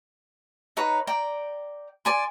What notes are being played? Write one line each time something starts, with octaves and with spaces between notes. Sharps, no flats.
D#4 B4 C#5 A#5
D5 G5 A#5
D5 G#5 C6